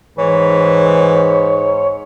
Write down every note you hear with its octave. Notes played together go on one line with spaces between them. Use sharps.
G#2 E3 C#5